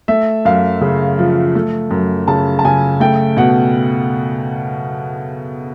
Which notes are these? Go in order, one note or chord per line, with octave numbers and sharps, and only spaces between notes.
A3 E5
F#2 F5
C#3
F3
A3
F#2
C#3 A5
A5
C#3 G#5
A3 G5
B2 F#5